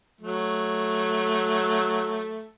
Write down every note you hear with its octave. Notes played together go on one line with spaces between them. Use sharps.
F#3 A3